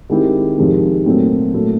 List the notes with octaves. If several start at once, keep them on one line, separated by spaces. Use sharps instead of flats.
D#3 G#3 C4 E4 G4
F2 C3 D#3 G#3 C4
A#2 F#3 A3 C4
A#2 F#3 A3